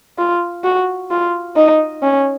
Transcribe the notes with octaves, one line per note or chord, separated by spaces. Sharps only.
F4
F#4
F4
D#4
C#4